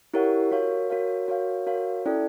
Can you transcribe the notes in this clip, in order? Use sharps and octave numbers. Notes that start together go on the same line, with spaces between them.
E4 G4 A#4 C#5 F#5
F#4 A#4 C#5 F5
F#4 A#4 C#5 F5
F#4 A#4 C#5 F5
F#4 A#4 C#5 F5
C#4 E4 A4 D5 G5